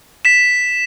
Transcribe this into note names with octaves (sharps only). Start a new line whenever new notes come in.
B6 E7